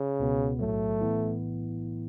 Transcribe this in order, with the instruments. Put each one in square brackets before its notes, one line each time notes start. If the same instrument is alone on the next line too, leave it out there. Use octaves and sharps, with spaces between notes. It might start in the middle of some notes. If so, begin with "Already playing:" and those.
Already playing: [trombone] C#3
[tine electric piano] C#2 B2 B3
[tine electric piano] B1 A2 F#3 [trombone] A3
[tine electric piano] A2 E3 B3 E4